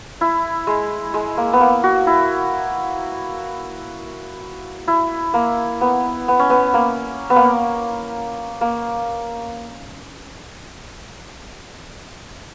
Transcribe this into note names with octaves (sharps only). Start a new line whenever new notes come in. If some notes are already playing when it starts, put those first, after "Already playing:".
E4
G#3
G#3
A#3
B3
A#3
F#4
E4
E4
A#3
B3
B3
C#4
B3
A#3
B3
A#3
A#3